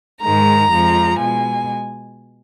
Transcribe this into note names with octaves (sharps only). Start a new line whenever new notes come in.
G#2 D#3 G#3 A#5
F2 F3 G#3
B2 G#3 G#5